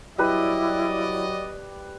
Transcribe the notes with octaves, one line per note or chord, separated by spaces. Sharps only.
F#3 G3 E4 B4 D5 D#5